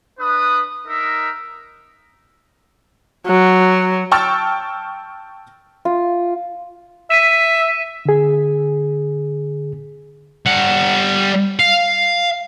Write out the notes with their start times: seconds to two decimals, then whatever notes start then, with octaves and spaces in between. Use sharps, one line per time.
0.19 D4 B4 D#6
0.86 D#4 A#4 E5
3.27 F#3
4.12 G5 A5 C#6 E6 F6 A6
5.85 F4
7.10 E5 B6 D#7 E7
8.05 D3 G#4
10.46 G3 F#5
11.60 F5